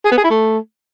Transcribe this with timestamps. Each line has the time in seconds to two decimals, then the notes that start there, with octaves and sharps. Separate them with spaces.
0.05 G#4
0.11 B3
0.18 G#4
0.24 E4
0.30 A3